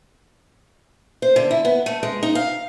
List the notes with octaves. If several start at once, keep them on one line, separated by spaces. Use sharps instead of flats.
C5
D3
E4
B3
A3
G#3
D#4
F5